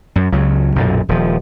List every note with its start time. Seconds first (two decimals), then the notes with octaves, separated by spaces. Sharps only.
0.16 F#2
0.32 C#2 C#3 F#3
0.76 B1 F#2 A#2
1.09 D#1 F3